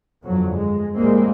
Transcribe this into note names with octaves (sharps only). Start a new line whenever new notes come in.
G1 F2 F#3
G#3
A1 A2 G3 G#3 A#3 C4